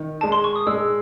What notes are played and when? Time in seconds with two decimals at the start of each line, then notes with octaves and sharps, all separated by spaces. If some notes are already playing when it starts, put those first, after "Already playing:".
Already playing: D#3
0.21 G#3 A5
0.32 C6
0.44 C#6
0.56 D#6
0.67 G#3 E6